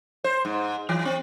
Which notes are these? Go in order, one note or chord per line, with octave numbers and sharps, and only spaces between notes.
C5
G#2
E3
C4